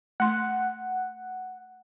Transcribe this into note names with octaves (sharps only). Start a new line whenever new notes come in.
A3 F#5 C6